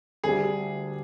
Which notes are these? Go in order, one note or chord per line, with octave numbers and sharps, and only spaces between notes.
D2 D3 G3 G#4